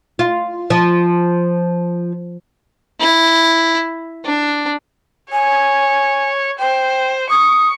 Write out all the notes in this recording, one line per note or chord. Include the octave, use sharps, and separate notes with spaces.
F4
F3
E4
D4
C#5 G#5
C5 G5
C#6 D#6